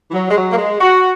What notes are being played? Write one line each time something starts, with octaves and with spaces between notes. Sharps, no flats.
E3
F#3
G#3
F#3
A#3
G#3
F#4